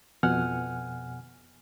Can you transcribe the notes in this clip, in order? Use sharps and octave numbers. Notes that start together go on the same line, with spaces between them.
F2 B2 F#5 G#5 F6